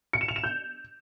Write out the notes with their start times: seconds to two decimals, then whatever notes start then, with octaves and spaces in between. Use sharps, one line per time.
0.13 C#7
0.21 E7
0.28 F7
0.36 E7
0.44 G6